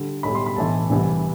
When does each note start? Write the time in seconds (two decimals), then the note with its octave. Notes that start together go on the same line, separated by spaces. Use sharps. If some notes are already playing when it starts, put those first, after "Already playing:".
Already playing: D3 G3
0.23 B1 A2 G3 B5
0.35 C6
0.46 B5
0.56 B1 A2 E3 A5
0.90 C2 C3 E3 G3